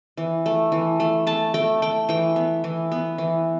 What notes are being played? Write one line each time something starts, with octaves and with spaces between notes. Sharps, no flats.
E3
A3
E3
A3
A3 A5
A3 G5
A3 G5
E3 G5
B3
E3
B3
E3